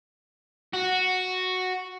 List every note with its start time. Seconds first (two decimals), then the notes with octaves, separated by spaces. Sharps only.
0.73 F#4